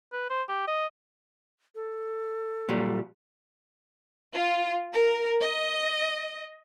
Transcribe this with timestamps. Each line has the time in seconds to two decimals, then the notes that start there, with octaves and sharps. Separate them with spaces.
0.13 B4
0.30 C5
0.49 G4
0.67 D#5
1.75 A4
2.69 A#2 F#3 G3
4.34 F4
4.92 A#4
5.41 D#5